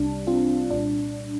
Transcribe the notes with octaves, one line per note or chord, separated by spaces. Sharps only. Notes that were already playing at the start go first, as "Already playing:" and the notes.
Already playing: C2 C3 G3 D4
C4 F4
C2 A#2 G3 D4